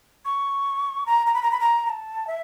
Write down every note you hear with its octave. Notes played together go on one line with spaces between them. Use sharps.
C#6
A#5
A#5
B5
A#5
B5
A#5
A#5
A5
E5